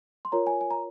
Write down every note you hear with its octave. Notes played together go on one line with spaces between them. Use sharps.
C6
F4 A#4 C#5 A#5
G#5
G#5
A#5